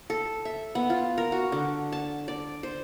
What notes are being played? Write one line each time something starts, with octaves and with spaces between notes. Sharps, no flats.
A4
E5
B3
F4
A#4
F#4
D3
A5
D5
C5